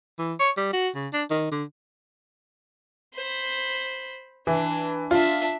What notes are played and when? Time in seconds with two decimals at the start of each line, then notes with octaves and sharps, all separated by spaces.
0.19 E3
0.40 C#5
0.57 G3
0.73 F#4
0.95 C#3
1.13 D4
1.30 D#3
1.51 D3
3.15 C5 B5
4.47 E3 D4
5.11 D4 F4 E5